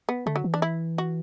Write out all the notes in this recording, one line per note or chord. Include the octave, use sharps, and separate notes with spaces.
B3
D3 A3
F#3
E3
D4
E4
F#4